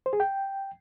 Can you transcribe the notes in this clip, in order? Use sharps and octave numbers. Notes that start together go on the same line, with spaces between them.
C5
G#4
G5